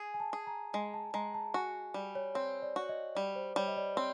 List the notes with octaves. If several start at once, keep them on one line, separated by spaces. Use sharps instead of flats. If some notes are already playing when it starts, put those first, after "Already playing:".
Already playing: G#4 G#5
G#5
A5
G#4
A#5
G#3 G#5
A5
G#3 A#5
A5
F#4 G#5
G3
C#5
C4 C#5
D5
F#4
D#5
G3 D5
C5
G3 C#5
D#5
D5
C4 C#5